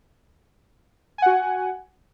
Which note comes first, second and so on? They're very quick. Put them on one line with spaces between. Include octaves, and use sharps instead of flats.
G#5 F#5 F#4